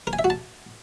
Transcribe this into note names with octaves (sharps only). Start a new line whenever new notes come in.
A#4
G#5
E5
F#4
A5